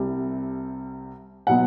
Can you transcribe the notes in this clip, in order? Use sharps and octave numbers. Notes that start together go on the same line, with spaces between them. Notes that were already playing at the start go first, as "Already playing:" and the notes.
Already playing: C2 C3 G3
B2 F#3 B3 F#5